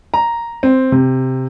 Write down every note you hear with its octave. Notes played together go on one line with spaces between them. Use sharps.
A#5
C4
C3